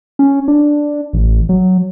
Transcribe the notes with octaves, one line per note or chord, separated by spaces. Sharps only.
C#4
D4
A1
F#3